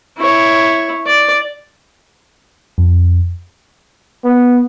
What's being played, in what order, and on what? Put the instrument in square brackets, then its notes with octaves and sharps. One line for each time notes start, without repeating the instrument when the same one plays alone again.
[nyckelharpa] E4 C#5
D5
[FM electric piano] F2
[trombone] B3